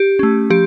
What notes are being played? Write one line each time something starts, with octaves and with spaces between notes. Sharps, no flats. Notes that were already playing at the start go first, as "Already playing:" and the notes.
Already playing: G4
A3 C#4
F3 G4